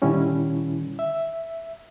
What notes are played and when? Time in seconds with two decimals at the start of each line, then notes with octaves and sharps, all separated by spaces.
0.02 A#2 D3 D#3 G3 C#4 E4
0.99 E5